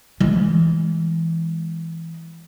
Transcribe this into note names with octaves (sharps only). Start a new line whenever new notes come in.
E3 G#3